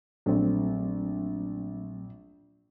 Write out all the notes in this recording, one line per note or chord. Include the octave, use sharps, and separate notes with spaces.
A#1 F#3 A3 C4